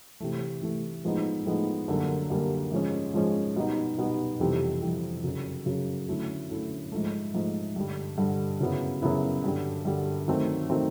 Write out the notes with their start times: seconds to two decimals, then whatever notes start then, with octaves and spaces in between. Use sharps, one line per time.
0.20 C3 E3 A3
0.62 C3 E3 A3
1.04 A2 F3 G#3 B3 D#4
1.46 A2 F3 G#3 B3 D#4
1.88 F#2 D3 G3 A#3
2.30 F#2 D3 G3 A#3
2.72 G#2 F3 G#3 C#4
3.14 G#2 F3 G#3 C#4
3.56 B2 G3 B3 D#4
3.98 B2 G3 B3 D#4
4.40 F2 C3 E3 G3
4.82 F2 C3 E3 G3
5.24 F#2 C#3 F#3
5.66 F#2 C#3 F#3
6.08 D3 F#3 A3 C#4 E4
6.50 D3 F#3 A3 C#4 E4
6.92 G#2 F3 A3
7.34 G#2 F3 A3
7.76 G2 D3 G3
8.18 G2 D3 G3
8.60 F#2 C#3 F#3 B3 E4
9.02 F#2 C#3 F#3 B3 E4
9.44 G2 D3 G3
9.85 G2 D3 G3
10.28 D#3 F#3 A3 C4
10.70 D#3 F#3 A3 C4